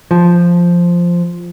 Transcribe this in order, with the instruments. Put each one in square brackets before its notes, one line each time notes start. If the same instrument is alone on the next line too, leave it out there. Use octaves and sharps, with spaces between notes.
[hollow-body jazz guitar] F3